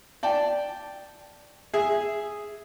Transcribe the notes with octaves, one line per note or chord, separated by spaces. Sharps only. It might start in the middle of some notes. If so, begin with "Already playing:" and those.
D5 G5 A5
G#4 E5